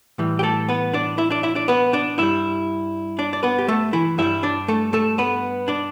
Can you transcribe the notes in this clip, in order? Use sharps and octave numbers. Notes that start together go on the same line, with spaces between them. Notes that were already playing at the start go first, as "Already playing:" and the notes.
A2 E3 G3
G4
A3 A4
B3 B4
D4 D5
E4 E5
D4 D5
E4 E5
D4 D5
B3 B4
D4 D5
G2 G3 E4 E5
D4 D5
D5
B3 B4
G4
A3 A4
E3 E4
G2 G3 E4 E5
D4 D5
A3 A4
A3 A4
B3 B4
D4 D5